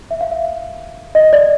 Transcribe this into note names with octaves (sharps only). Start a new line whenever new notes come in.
E5
F5
E5
D#5
D5